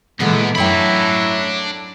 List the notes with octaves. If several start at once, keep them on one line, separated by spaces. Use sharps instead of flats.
A#2 D3 E3 F#3 G#3 B3
F#2 F#3 A3 D4 E4 G5 B5